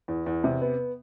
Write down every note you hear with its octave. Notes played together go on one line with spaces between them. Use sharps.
E2
E2
C3
B3